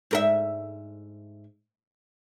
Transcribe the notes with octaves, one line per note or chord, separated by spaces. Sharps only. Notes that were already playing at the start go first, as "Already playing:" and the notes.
G#2 A#4 E5